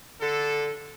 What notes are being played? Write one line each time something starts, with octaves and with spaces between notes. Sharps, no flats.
D3 A4